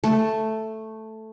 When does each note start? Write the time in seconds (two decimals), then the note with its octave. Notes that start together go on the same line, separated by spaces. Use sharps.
0.04 A3